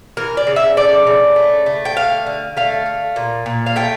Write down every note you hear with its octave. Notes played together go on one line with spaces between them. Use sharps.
E3 A#4
D5
C#3
E5
A3 D5
C#3
A3
A3
G5
D3 F5
D3
A3 F5
A3
A#2
A#2
F5
A3 G5